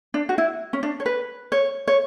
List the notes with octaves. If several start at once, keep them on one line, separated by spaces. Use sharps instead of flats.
D4
F#4
E4
C#4
D4
C#5
B4
C#5
C#5